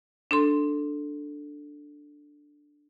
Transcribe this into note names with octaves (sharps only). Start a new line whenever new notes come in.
D4 A4 C6